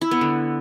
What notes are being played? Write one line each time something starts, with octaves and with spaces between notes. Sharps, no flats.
E4
B3
D3